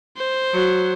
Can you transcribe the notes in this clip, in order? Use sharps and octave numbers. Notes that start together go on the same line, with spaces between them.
C5
F#3